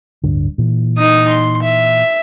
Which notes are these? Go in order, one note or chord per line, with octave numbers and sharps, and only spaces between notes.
D1 G2 D3
A#2 E3
D#4 D#6
C6
E5